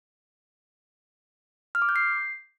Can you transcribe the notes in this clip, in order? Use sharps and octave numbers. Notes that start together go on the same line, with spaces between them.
F6
D6
G6
C7